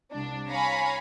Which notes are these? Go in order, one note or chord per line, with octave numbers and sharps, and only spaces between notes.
C2 D4
C#5 F5 G#5 A#5 B5